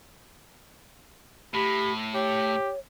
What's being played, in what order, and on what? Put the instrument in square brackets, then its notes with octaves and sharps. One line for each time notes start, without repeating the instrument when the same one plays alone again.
[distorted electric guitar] A2 [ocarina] G4 [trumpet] B5
[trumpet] G4 [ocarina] C#5